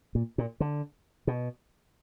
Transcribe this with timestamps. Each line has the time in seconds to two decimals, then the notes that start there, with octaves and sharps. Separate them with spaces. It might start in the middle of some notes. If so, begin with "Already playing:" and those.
0.15 A#2
0.38 A#2
0.60 D3
1.27 B2